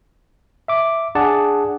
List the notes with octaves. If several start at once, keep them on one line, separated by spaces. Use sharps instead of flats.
E5 D6
D4 G#4 D5 F#5 A5